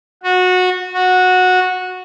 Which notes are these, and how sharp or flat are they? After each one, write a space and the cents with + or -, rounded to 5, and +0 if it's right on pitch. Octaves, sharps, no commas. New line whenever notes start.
F#4 -20
F#4 -15